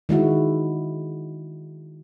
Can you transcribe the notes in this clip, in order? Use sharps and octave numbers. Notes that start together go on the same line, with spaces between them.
D#3 G#3 E4 F#4